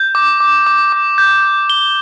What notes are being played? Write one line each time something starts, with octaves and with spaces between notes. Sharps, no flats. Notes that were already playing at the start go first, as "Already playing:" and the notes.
Already playing: G6
D6
D6
D6
D6
G6
G6
G7